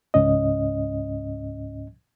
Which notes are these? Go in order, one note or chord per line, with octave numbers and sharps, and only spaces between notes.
C#2 G#2 C#4 D#5